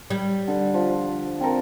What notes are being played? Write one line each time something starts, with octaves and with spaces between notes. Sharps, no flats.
G3
D3
F3
C4 A4 A#4